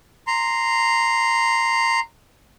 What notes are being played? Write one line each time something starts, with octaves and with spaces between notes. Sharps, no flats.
A#5 C6